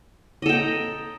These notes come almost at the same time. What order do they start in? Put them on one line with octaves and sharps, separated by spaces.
D#5 A4 G5 A#5